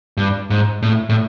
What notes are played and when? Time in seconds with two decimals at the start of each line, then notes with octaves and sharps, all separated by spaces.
0.17 G2
0.50 G#2
0.82 A2
1.09 A2